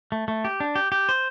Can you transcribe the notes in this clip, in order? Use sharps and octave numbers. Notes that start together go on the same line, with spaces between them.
A3
A3
G4
D4
G4
G4
C5